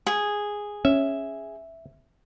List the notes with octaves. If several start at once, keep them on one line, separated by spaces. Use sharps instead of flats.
G#4
C#4 E5